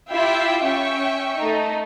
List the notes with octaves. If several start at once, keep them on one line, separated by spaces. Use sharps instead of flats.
E4 F4 G4 E5 G5 C6
C#4 E5 G5 C#6
A3 D#4